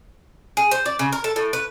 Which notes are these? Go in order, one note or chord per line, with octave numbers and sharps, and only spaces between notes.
G#4
C5
D5
C#3
A#4
A4
A2
B4